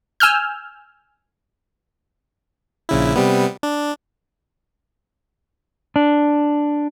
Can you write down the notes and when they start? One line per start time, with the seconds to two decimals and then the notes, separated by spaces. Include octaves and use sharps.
0.20 G#5 E6 F6 G6
2.89 A#1 C#3 E4
3.16 C3 G3 B3
3.63 D4
5.96 D4